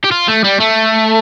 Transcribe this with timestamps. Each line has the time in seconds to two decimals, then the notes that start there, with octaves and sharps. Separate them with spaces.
0.04 G4
0.11 F4
0.28 A3
0.44 G3
0.60 A3